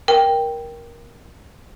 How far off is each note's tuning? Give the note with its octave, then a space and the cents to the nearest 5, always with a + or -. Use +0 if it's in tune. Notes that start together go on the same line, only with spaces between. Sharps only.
A#4 +15 G5 +0